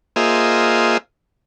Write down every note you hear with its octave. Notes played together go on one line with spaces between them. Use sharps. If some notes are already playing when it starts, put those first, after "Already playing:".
A#3 F4 G#4 C5 D#5 E5